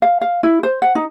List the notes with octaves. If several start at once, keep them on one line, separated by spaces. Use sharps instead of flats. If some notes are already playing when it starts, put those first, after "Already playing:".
F5
F5
E4
C5
F#5
D#4